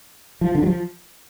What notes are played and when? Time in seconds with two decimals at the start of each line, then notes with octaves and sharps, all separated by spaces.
0.41 F3
0.55 D3
0.63 F#3
0.67 F3